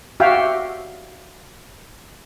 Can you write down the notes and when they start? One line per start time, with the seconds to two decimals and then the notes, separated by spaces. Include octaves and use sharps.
0.20 F#4 G4 E5 F5 G5